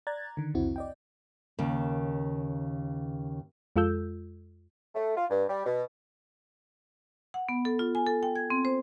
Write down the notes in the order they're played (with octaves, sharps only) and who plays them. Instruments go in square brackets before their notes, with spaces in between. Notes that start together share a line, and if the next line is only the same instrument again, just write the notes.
[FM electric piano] D5 A#5 F#6 G#6 A6
D3 D#3
C2 F2 C4 E4 F#4
D5 D#5 G5
[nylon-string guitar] D#2 C#3 A#4
[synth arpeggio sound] F2 G#3 F4 A4 E6 G6
[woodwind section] A3
F4
G2
G3
B2
[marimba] F#5
B3
A4
F4
G#5
A4
G5
G#6
C4
C5